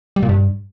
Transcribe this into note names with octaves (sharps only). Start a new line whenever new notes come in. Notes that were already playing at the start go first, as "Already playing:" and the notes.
G3
A#2
G2